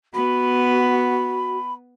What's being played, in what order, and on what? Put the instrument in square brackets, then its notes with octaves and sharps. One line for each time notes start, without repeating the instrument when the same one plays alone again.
[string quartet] B3 [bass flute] F#4 [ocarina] B5